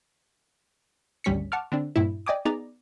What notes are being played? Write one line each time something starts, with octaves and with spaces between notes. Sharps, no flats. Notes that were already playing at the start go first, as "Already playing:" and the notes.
G#1 D2 G3 C#4 B6 C#7
F#5 A5 C#6 D6 F6
D3 C4 D4
G2 A#2 E4
D5 D#5 G5 G#5 D6 D#6
B3 D#4 G#4 D5 A#5